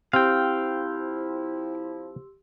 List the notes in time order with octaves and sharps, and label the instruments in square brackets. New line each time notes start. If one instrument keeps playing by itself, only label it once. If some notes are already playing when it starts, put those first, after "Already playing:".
[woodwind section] F3 E4 [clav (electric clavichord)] C4 [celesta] G4 C6 E6 [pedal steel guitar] F5 G5